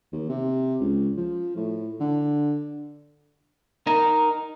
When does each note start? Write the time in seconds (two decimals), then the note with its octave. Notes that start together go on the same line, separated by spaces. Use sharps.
0.12 D#2
0.30 C3
0.80 C#2
1.17 F3
1.56 A2
2.00 D3
3.87 D#4 A#4